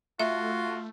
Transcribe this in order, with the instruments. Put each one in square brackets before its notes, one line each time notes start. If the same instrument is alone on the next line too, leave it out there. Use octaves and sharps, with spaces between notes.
[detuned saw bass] A3 [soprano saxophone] F4 [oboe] F#4 [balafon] E5